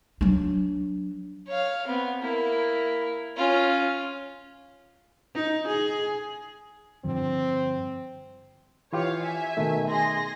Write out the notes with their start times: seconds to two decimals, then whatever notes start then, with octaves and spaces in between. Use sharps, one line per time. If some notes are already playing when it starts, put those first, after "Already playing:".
0.21 F#3 D4
1.47 C#5 F5
1.86 B3 C4
2.22 A#3 E4
3.37 C#4 F4
5.35 D#4
5.68 G#4
7.04 G2 D3 F3 C4
8.93 E3 F4 G4 C#5 F5
9.22 E5 G#5
9.57 B2 D#3 A3
9.88 G#4 C6 A#6